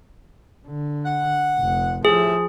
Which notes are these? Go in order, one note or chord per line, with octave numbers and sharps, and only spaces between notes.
D3
F#5
F1
A2 F3 G4 G#4 E5